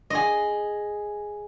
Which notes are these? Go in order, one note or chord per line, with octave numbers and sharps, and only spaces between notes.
G#4 D#5